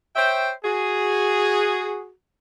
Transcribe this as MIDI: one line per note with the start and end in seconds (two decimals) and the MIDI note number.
0.16 0.51 72
0.16 0.51 73
0.16 0.51 76
0.16 0.51 79
0.64 2.09 66
0.64 2.09 68